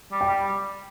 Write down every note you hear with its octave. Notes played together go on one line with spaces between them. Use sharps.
G3
G5
G3